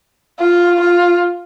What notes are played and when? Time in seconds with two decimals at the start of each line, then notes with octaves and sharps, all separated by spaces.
0.39 F4
0.80 F4